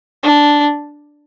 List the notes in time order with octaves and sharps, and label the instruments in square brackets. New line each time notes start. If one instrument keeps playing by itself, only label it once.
[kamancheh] D4